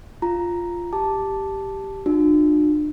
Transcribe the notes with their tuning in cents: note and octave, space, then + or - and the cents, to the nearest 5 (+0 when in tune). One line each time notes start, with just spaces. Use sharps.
F4 +0 A#5 +0
G4 +0 A5 +0 D6 +0
D4 +40 F4 +45